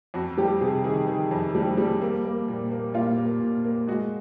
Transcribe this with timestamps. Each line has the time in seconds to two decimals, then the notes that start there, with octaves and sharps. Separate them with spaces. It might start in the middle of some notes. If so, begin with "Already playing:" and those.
0.14 F2 F#4
0.38 G3 G4
0.61 C3 G#4
0.84 D#3 G#4
1.08 D#3
1.31 F2
1.55 G3
1.77 G3
2.02 A#3
2.25 A#3
2.48 A#2
2.71 A#3
2.94 A#2 F4
3.18 A#3
3.41 A#2
3.64 A#3
3.87 G#3 F#4